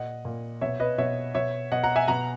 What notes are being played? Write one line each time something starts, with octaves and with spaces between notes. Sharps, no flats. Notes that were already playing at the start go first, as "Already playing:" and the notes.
Already playing: A#2 D#5 F#5
A#2
B2 C#5 E5
B4 D#5
B2 C#5 E5
B2 C#5 E5
B2 D#5 F#5
F#5 A#5
E5 G#5
B2 F#5 A#5